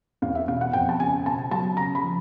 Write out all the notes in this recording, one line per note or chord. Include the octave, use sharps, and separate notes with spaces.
E2 F5
E5
B2 F5
F#5
F2 G5
A5
C#3 G#5
B2 A5
F#3 A5
C#3 A#5
B5
F3